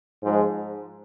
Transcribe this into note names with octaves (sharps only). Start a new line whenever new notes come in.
G#2 F3 G#3